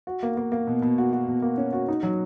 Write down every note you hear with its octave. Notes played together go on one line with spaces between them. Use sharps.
F#4
A#3
A#3
A#3
B2
B2
F#4
F#4
B2
A#3
C#4
F#4
D#4
F#3